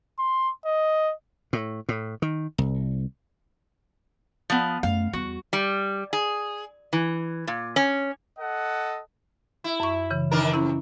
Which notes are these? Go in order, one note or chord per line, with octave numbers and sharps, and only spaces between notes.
C6
D#5
A2
A2
D#3
C2
F3 B3
F#2 A3 F5
E2 G3 F#4
G3
G#4
E3
A#2
C#4
A4 D#5 F#5
E4
F#2 C#6
C#3 E3
D#3 D4 A#4
F2 C#4 E4